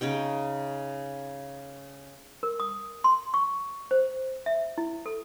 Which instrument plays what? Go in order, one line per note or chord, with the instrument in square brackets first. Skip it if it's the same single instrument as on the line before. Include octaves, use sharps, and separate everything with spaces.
[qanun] C#3 C#4 D#4 G5
[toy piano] A#4
D#6
C6
C#6
C5
E5
E4
A4